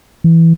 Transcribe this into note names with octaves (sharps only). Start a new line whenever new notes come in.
E3